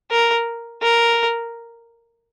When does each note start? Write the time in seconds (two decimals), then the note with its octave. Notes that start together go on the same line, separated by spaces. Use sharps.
0.11 A#4
0.82 A#4